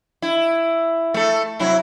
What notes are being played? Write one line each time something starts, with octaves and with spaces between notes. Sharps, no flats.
E4
A3 A4
C3 F#3 E4